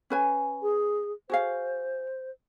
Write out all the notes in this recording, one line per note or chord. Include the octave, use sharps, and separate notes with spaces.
C#4 B4 G#5
G#4
F#4 G#4 C5 F5